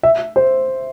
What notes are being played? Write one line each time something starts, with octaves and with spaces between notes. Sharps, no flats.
E5
C5